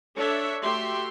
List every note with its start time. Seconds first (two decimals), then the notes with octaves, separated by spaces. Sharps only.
0.15 D4 A4 C#5 E5
0.62 A3 F#4 G4 E5 C6